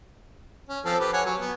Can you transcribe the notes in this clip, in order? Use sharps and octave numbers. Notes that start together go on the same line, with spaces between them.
C#4
F3 C4 A4
G4 B4
C#5 F#5 G#5
F#3
B3